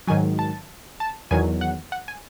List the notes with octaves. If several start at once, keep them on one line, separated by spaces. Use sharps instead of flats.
G#2 D#3 F#3 G#5
A5
A5
E2 D#3 F#3 G#5
F#5
F#5
G#5